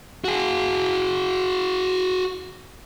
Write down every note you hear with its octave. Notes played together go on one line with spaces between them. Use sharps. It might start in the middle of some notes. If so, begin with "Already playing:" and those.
F#4 G#4